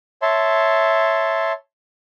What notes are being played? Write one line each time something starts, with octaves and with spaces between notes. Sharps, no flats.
C#5 E5 A5 C6